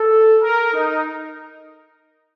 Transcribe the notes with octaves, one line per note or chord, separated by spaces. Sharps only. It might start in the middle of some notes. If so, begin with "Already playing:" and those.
Already playing: A4
A#4
D#4